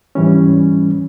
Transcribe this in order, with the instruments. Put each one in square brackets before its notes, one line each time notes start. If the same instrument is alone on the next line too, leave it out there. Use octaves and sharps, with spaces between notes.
[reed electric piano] G#2 E3 G3 C#4